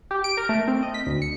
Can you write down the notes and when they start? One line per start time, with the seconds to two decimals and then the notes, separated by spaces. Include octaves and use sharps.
0.11 G4
0.24 D7
0.37 A#4
0.49 A3
0.68 C4
0.83 D#5
0.94 B6
1.06 D2
1.22 C#7